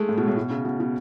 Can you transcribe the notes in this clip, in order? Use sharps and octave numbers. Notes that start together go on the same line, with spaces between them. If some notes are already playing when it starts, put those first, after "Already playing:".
Already playing: G#3 A3
A2
B2
A2
B2
C#3
B2
B2